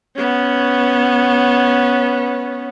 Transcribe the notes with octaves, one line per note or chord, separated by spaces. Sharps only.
B3 C#4